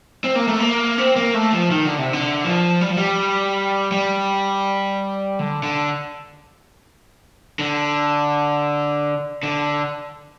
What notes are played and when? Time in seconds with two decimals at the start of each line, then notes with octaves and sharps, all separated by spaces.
0.24 C4
0.35 A#3
0.48 A3
0.59 A#3
0.98 C4
1.16 A#3
1.34 A3
1.53 F3
1.71 D#3
1.85 D3
1.98 C3
2.13 D3
2.45 F3
2.81 G3
2.90 F3
2.97 G3
3.92 G3
5.39 D3
5.63 D3
7.59 D3
9.43 D3